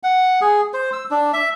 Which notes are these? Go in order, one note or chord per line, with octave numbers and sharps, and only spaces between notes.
F#5
G#4
C5
E6
D4
E5